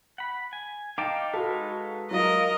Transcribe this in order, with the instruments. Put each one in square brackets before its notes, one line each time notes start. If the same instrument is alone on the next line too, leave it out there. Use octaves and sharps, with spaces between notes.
[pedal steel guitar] F#5 B5
G#5
[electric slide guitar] D#4 [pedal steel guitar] F5 G5 A5 [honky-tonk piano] D6
[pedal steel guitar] G#3 B4 F5 [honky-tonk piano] F#4 A4
[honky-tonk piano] F#3 F4 [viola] A#4 D#5